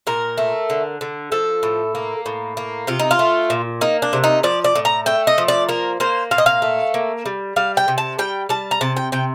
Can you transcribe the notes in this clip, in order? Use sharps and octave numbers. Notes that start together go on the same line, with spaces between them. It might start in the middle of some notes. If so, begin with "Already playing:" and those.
A#2 A#4
A3
D3
D3
F3 A4
A2
A#3
A2
A#3
C3 F4
D#4
F4
A3
A#2
A#3 D#4
D4
C3
D#4
F3 D5
D5
A2
A#5
A3 G5
D#5
F3
D5
A#3 A#4
A#3 C5
A#2 F5
D#5
F5
A3
A#3
G3
G3 F5
G5
C3
A5
G3 G5
G3 A5
A#5
C3 A5
G5
C3 G5